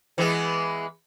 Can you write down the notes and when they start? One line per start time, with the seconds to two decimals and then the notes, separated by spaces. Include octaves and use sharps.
0.18 E3 G#3 B3